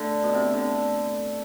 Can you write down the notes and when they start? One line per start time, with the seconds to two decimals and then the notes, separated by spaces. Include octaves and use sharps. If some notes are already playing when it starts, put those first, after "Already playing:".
Already playing: D3 A3
0.23 B2
0.33 C3
0.53 D3